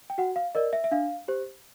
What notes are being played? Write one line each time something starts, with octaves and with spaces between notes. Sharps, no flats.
G5
F#4 F#5
F5
A#4 D5 D#5
E5
E5
D4 F5
G4 C5